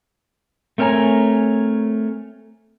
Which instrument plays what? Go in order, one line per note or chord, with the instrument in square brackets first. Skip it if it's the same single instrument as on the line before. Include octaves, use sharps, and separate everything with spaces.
[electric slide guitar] A3 C4 A#4 C#5 G#5 A#5